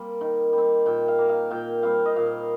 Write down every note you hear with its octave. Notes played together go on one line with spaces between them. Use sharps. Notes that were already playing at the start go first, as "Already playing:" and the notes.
Already playing: G3 A#3 C4 C5
D#3
G3 C4
A#2 G5
F5
A#3
F5
A#2 G5
G3 C4 F5
D#5
A#2 F5